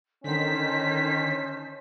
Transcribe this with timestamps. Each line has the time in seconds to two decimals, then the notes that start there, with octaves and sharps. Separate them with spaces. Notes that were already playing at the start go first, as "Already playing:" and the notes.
0.24 D3 D#3 C#4 C5 D#5 A5 B6